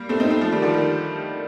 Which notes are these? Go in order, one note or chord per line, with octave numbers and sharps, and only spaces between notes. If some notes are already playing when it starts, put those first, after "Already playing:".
Already playing: G3 A#3
A3 C4
C4 D#4
A3 C4
F3 A3
D#3 G3
D3 F3
D#3 G3